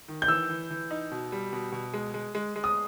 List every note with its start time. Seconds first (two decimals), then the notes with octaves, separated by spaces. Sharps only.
0.08 D#3
0.22 G6
0.28 E3 E6
0.50 E3
0.71 E3
0.91 D#4
1.12 B2
1.32 G3
1.53 B2
1.72 B2
1.94 G#3
2.14 G#3
2.35 G#3
2.56 G#3
2.64 D#6